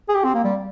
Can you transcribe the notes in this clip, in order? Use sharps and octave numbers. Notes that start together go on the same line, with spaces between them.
G#4
G4
C4
A#3
G3